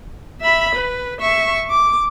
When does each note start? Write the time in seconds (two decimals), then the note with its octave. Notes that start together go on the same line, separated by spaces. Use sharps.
0.42 E5 B5
0.75 B4
1.21 E5 C#6
1.70 D6